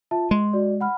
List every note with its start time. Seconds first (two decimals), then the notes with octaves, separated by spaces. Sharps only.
0.11 F4 E5 A5
0.31 G#3 C6
0.53 F#4 D5
0.81 F#5 B5 F6